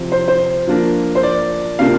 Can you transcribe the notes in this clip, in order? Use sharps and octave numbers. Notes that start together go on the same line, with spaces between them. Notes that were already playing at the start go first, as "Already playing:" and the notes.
Already playing: C3 F3 C4
C5
C5
F3 A#3 D4 F4
C5
D5
C3 A#3 D4 F4 F5